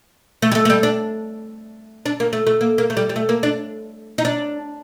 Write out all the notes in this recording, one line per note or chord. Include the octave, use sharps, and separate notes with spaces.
A3
G3
A3
A3
G3
D4
D4
A#3
A3
A3
A#3
A#3
A3
G3
G3
A3
A#3
D4
D#4
D4